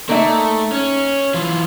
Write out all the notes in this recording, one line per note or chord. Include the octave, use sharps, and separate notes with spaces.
A3 A#3 D#4 E5
C#4
E3 F4